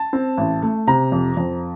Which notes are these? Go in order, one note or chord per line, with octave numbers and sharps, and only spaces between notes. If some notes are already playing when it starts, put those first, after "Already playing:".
Already playing: A5
C4
A1
A3
C3 A#5
F2
F2